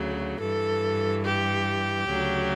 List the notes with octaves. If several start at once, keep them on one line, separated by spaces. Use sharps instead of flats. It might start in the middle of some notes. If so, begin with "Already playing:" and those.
Already playing: D2 C#3 F#3
G2 E3 A4
G4
D2 C#3 F#3